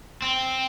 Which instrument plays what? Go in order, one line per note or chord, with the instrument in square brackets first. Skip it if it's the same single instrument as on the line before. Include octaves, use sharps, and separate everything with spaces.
[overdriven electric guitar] C4